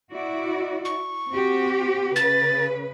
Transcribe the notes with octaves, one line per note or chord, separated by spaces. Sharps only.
E4 F#4 D5
C#6
C4 F#4 G4
C#3 B4 A6